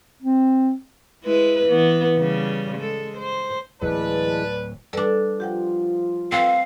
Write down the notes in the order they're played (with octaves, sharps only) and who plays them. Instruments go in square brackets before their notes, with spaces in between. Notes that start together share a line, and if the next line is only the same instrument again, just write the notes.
[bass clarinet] C4
[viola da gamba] G#3 E4 B4
E3 B3
C#3 G3
G#3 A4
C5
[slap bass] D1 F#3 [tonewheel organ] E3 G#3 [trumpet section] B4 [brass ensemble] D5 A5
[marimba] G3 B4 D5 [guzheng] D4 A4
[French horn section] F3 F4 [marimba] G4 F#5 G5
[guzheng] C4 [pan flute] F5 [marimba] E6